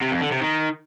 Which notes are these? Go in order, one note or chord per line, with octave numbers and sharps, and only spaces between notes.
C3
F2
D3
C3
D#3